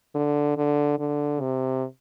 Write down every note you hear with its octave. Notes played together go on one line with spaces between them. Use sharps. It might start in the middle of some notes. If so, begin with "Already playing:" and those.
D3
D3
D3
C3